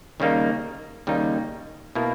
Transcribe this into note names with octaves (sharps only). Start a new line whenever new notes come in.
D#2 C#3 G3 A#3 D#4
D#2 C#3 G3 A#3 D#4
B2 A#3 E4